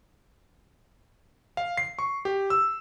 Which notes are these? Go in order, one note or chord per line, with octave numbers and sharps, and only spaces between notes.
F5
C7
C#6
G4
E6